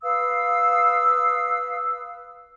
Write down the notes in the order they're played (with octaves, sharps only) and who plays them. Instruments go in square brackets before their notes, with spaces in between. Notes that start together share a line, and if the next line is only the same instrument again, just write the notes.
[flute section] B4 F5 D#6 E6